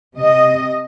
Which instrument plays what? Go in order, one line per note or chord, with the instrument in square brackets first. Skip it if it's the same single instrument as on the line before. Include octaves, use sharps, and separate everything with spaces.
[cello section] C3 D#5